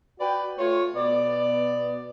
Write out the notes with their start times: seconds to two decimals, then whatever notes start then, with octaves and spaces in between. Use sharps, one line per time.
0.20 F#4 B4 D5 G5
0.58 A3 F4 C#5
0.96 B2 B3 D5